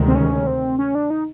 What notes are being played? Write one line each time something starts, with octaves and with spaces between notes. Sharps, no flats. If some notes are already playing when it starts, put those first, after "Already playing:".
Already playing: D2 C3 D#3 G#3
C4
C#4
C4
C#4
D4
D#4